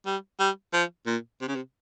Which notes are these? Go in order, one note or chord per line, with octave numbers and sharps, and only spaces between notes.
G3
G3
F3
A#2
C3
C#3
C3